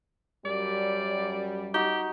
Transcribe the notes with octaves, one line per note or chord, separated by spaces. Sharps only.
F#2 G3 D5
D#4 F#4 G4